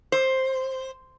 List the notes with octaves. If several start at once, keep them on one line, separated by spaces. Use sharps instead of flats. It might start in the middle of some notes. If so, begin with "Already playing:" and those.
C5